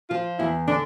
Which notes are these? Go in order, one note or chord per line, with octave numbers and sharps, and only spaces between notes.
F3 F4
E2 E4
D3 D4